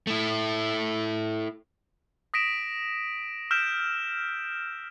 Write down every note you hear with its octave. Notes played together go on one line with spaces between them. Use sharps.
A3 E4
D#6 A#6 B6 D7 E7
E6 F6 G6 B6 D7 E7